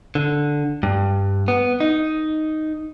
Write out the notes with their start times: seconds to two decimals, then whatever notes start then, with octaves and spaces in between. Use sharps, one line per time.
0.15 D3
0.83 G2
1.48 B3
1.80 D#4